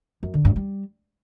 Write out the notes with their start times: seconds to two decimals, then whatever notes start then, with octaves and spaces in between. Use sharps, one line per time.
0.23 F#2
0.34 D3
0.45 G2
0.56 G3